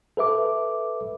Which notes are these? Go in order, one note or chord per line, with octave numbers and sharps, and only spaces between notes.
A4 B4 E5 D6